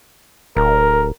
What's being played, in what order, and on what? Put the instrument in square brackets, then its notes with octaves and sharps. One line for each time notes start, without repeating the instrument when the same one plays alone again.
[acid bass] D1 [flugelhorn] A#4